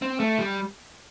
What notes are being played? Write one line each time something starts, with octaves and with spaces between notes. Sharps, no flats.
C4
A3
G3